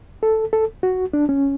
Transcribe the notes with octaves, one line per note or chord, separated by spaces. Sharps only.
A4
A4
F#4
D4
C#4